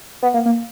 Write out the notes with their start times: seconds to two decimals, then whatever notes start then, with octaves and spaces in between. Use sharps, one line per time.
0.22 B3
0.34 A#3
0.46 A#3